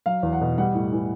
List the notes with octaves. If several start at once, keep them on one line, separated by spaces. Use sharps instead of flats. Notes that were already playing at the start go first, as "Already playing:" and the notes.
F#3 F5
E2
F#5
B2
G3 F#5
A2
E3